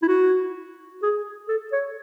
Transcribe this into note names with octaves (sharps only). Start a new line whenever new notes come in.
E4
F#4
G#4
A4
C#5